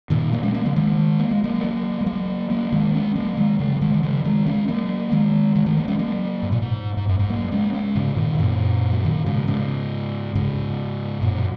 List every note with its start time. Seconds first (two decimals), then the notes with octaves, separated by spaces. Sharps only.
0.10 A#2 D#3
0.33 F#3 A#3
0.43 G#3 C#4
0.54 F#3 A#3
0.66 C#3 F#3
0.76 D#3 G#3
1.19 A#3
1.31 G#3
1.44 F#3 A#3
1.64 F#3 A#3
2.01 G#3
2.06 F#3 A#3
2.50 F#3 A#3
2.73 D#3 G#3
2.94 G#3 C#4
3.15 F#3 A#3
3.37 D#3 G#3
3.59 C#3 F#3
3.76 F#3
3.81 D#3 G#3
3.94 D#3
4.03 C#3 F#3
4.24 D#3 G#3
4.46 G#3 C#4
4.68 F#3 A#3
5.12 D#3 G#3
5.55 D#3 G#3
5.66 D#3 G#3
5.77 F#3 A#3
5.88 G#3 C#4
5.99 F#3 A#3
6.43 G#2
6.52 A#2
6.62 G#2
6.97 G#2
7.09 F#2
7.19 G#2
7.30 F#3 A#3
7.52 G#3 C#4
7.73 G#3 C#4
7.95 G#2 C#3
8.17 A#2 D#3
8.35 C#3
8.39 F#2 A#2
8.92 F#3
9.05 A#2 D#3
9.26 G#2 C#3
9.47 G#2 C#3
10.35 G#2 C#3
11.22 F#2 A#2
11.38 F#3